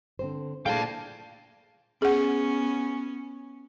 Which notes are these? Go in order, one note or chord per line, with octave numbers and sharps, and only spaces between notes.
D3 C4 C5
A#2 A3 D4 E4 G#4 F5 G5 A5
B3 C#4 G#4 F#5